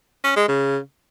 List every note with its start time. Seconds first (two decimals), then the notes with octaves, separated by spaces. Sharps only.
0.24 C#4
0.36 G#3
0.48 C#3